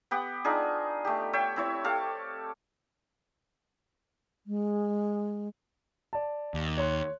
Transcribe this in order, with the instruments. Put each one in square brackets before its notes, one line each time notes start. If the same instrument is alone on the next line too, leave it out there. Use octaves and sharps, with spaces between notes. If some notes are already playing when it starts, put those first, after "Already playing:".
[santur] B3 G4 F#5
D4 D#4 F4 G#4
A3 G4
C#5 E5 G5
C4 E4 C#5
G4 A4 F5
[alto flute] G#3
[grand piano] D5 A5
[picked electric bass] D#2
[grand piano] C#5 C6 F#6